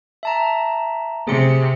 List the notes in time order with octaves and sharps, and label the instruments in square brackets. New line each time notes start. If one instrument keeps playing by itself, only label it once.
[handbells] E5 A5 A#5
[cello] C3 [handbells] G#4 C#7